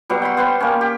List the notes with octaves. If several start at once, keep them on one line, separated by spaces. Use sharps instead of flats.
B2 F#3 G3
G5 B5 C6
B3 C5 C6
A#3 C#4
G4